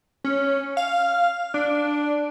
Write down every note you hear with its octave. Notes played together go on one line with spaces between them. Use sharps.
C#4
F5
D4